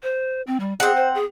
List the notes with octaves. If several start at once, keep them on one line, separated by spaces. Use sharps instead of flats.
C5
C4
G3
C4 G#4 F#5
C5
G#4